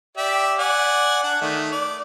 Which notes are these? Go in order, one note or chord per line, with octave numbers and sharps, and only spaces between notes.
G4 D5 E5
D5 F#5 G#5
D4 F#5
D#3 A3
D5